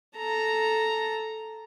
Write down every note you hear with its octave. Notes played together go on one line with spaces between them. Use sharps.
A4 A#5